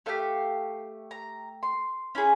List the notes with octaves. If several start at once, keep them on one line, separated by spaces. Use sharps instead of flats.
A3 D4 G4 F5
A#5
C6
C#4 E4 G#4